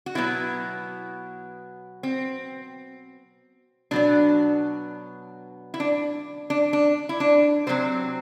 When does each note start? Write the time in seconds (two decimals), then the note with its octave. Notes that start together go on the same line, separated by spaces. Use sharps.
0.06 F#4
0.15 B2 F#3 B3 E4
2.03 C4
3.91 B2 F#3 B3 D4
5.74 E4
5.80 D4
6.50 D4
6.73 D4
7.09 E4
7.20 D4
7.67 C3 F#3 C4 C5